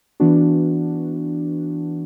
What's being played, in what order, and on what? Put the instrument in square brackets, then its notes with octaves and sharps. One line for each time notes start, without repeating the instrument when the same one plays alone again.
[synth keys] E3 B3 D4 F#4